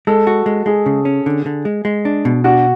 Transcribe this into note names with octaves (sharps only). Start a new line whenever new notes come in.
G#3 A4
F#4
G#3
G#3 G#4
C#3
C#4
D3
D3
G#3
G#3
D4
B2
D4 F#4